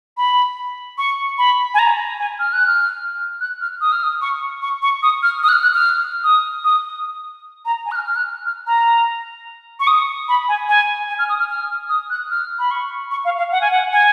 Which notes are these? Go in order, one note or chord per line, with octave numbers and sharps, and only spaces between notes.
B5
C#6
B5
G#5
A#5
G#5
F6
F#6
F6
F#6
F6
D#6
F6
D#6
C#6
C#6
C#6
D#6
F6
D#6
F#6
F6
F#6
F6
D#6
D#6
A#5
G#5
F#6
F6
F6
F#6
F6
A#5
C#6
D#6
B5
G#5
G#5
G#5
F6
D#6
F6
F6
D#6
F#6
F6
B5
C#6
C#6
F5
F5
F#5
G#5
F#5
G#5